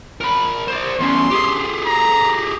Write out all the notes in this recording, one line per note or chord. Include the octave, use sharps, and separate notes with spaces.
A#4 B5
C5 D5
E2 C#4 C6
G4 G#4
A#5